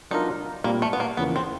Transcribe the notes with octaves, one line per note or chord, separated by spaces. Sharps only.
F#3 B3 D4 D#4 F4 A#4
A#2 G3 A#3 C4
A3
B3
A#3
E2 C#3 F3 A#3 B3
C4